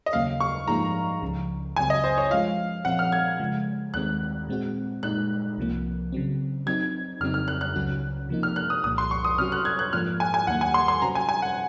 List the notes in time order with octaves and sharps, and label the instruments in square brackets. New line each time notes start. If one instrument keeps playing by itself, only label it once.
[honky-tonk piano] D#5
[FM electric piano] D#2 C#3 F#3 A#3 C#4 [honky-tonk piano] F5
[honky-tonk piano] C#6
[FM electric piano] G#2 F3 A#3 D#4 G#4 [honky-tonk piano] A#5
[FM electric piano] C#2 C#3 F3
[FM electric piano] C#2 C#3 F#3 C4 [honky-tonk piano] G#5
[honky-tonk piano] D#5
C5
C#5
[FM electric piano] F3 G#3 C#4 F4 [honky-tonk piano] F5
[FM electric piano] A#2 F3 C4 [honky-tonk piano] F#5
[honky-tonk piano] F6
G#6
[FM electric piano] C#3 F3 G#3
[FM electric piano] D#2 D#3 G#3 C4 [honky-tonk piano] F#6
[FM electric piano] A#2 G#3 C4 F#4
[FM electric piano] A#2 G#3 D#4 [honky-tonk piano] F#6
[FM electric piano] C2 C3 F3 A#3
C#3 F#3 C4
[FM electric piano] F#3 C4 D#4 [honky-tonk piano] G#6
[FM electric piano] F2 C#3 F#3 C4 D#4 [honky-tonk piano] F6
[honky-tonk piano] F6
F#6
F#6
[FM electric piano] C#2 C#3 F#3 C#4 F#4
C3 F3 A#3 D#4
[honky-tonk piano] F6
F#6
D#6
[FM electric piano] C2 A#2 F3 [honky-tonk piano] D#6
[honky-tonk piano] C6
C#6
D#6
[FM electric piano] C3 F#3 C#4 F#4 C#5 [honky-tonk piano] F6
[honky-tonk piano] F#6
G#6
F#6
[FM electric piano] G#2 F3 A#3 F4 [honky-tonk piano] F6
[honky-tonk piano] G#5
G#5
[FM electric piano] D#2 D#3 F#3 A#3 [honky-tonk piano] F#5
[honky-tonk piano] G#5
C6
C6
[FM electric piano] C3 F#3 C#4 F#4 C5 [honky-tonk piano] A#5
[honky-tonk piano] G#5
G#5
F#5